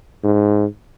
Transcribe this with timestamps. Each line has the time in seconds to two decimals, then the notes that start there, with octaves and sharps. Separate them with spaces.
0.24 G#2